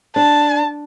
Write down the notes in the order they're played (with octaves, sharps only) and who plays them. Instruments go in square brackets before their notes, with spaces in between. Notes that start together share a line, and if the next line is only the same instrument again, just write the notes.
[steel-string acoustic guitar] D4 [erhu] A5